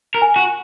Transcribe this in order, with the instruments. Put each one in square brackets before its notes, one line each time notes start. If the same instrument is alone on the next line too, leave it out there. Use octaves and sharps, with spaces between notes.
[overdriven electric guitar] A#4
[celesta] G#5
[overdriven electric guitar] F#4